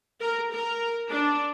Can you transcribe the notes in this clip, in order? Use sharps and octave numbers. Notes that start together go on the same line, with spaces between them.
A#4
A#4
D4